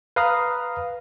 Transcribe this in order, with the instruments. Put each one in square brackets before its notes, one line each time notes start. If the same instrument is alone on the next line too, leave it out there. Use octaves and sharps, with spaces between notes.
[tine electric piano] B4 F5 A#5 D#6